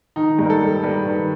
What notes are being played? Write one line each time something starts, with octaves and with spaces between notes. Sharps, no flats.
D#3 D#4
G2
A#4
A4
G3
G2 B4
D#3